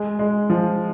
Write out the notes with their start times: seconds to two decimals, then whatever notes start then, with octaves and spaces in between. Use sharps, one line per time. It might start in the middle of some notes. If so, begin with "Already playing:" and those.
Already playing: G#3
0.19 G#3
0.50 F3